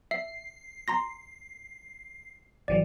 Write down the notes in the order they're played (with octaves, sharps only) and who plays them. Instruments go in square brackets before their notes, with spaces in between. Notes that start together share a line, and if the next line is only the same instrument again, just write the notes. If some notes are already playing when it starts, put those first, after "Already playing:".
[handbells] E5 [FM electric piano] C7
[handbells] A#5 C6 A#6
[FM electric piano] G#1 E3 F#3 [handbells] D5